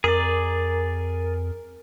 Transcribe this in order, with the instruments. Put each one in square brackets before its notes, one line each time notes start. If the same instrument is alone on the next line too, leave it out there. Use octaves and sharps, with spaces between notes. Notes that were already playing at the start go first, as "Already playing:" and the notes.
[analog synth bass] F2 [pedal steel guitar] G#4 D5 [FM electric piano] A#4